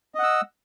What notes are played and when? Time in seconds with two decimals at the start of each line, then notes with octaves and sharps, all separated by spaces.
0.15 D#5
0.19 F#5
0.23 E6